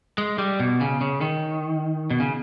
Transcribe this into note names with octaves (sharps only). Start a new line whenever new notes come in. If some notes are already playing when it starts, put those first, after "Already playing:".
G#3
G3
B2
C#3
C#3
D#3
B2
C#3